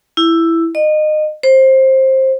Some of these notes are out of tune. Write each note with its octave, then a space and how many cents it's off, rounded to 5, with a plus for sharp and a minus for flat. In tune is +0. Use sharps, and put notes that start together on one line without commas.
E4 +5
D#5 -25
C5 +15